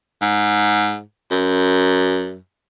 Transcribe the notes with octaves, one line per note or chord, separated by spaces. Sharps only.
G#2
F#2